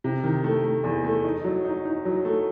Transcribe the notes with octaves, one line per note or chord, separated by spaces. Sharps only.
C3
D#3
A3
A3
E2
A3
D#4
F#3
D#4
D#4
F#3
A3